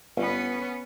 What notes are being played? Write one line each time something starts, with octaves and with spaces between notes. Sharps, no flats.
G1 B3 C#4